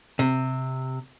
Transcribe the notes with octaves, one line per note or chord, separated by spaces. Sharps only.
C3